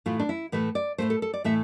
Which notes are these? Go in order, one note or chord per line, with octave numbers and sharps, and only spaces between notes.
A2 E3 A3 F4
D4
E4
A2 E3 A3 B4
D5
A2 E3 A3 C5
A4
A4
D5
A2 E3 A3 E5